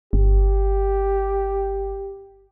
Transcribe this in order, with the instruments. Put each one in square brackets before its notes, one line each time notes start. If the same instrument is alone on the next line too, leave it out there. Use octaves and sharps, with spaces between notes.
[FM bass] G1 [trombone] G4